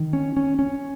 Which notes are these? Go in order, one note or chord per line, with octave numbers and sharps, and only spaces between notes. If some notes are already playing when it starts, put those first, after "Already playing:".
Already playing: D#3
C#4
C#4
C#4